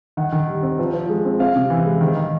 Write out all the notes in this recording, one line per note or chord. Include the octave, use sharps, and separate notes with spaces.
D#3 F#5
D#3
G3
C4
F3
F3
G#3
C4
C4 F5
C3
E3
G#3
D#3
D#3